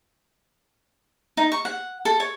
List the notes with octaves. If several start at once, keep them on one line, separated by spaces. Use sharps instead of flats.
D#4
C#6
F#5
A4
C#5